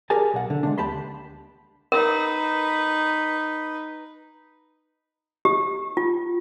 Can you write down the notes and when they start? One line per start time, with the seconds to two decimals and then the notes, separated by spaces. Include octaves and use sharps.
0.10 G4 G#4 A#4 D5 G#5 A5
0.34 B1 F#5
0.50 D3
0.63 G#3 A3 D4
0.78 D2 G4 D5 A5 B5 C6
1.92 D#4 A#4 B4
5.45 G4
5.97 F4